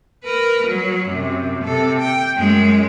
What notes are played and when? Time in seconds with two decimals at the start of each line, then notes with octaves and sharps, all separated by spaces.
0.24 A#4 B4
0.67 F#3
1.09 F#2 C3
1.64 C3 A4
1.99 G5
2.38 F#2 G#3